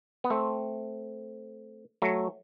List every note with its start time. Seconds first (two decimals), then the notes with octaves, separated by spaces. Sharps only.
0.24 B3
0.30 A3 C4
2.02 F#3 A3